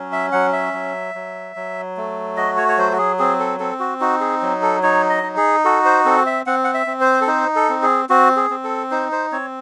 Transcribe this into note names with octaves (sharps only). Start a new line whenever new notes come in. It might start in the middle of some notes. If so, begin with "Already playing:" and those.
Already playing: F#3 C#4
E5
F#3 F#5
E5
F#3
F#3
F#3
A3
F#4 D#5
C#5
C#5
F#3 C5
F#4
G#4
C4 G#4
A4
C4 A4
F#4
D#4 F#4
G#4
F#3
A4
D#4 C#5
D#5
D#4
G#4
F#4 A4
C5
C4 A4
E5
C4 F#5
F#5
E5
C4
C5
A4
D#4 C5
A4
C4
G#4
C4 F#4
G#4
C4
A4
D#4 C5
C5
C4 C#5